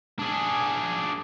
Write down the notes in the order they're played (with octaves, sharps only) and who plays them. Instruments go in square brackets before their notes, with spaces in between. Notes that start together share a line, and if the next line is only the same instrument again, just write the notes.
[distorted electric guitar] D4 G#4